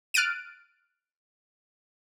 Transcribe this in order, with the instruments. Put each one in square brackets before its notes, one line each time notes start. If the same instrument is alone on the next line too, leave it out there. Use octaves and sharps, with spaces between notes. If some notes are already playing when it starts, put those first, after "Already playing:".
[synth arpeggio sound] F6 F#6 A6 D7 D#7